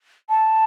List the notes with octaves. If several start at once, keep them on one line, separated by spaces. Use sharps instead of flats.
A5